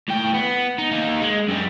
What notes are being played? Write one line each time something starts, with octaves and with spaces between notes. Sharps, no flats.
A2 G5
B3
D#4
A#3 D#4
G#3
F#2 G3